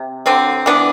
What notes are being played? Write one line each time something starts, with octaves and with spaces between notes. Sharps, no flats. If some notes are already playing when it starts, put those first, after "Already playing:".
Already playing: C3
D3 F#3 C4
E3 B3 D4